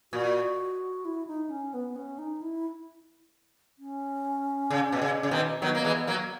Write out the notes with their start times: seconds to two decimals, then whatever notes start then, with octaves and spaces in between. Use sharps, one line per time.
0.13 A#2 F#4
1.05 E4
1.27 D#4
1.49 C#4
1.74 B3
1.96 C#4
2.18 D#4
2.41 E4
3.79 C#4
4.70 C#3
4.92 B2
5.02 C#3
5.23 C#3
5.31 B2 D#3
5.62 D#3 F#3 B3
5.75 A#3
5.84 E3 G#3
6.07 F#3 A#3